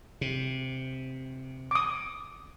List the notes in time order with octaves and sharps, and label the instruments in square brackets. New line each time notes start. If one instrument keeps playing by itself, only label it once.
[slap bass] C3
[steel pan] D6 D#6